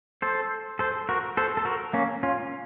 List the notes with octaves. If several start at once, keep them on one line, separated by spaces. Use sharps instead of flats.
A4 C5
A4 C5
F#4 A#4
A4 C5
A4
F#4 A#4
A#3 C#4
C#4 F4